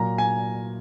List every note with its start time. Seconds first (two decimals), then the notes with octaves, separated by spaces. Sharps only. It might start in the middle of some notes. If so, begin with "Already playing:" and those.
Already playing: A#2 F#3 A#5
0.18 G#5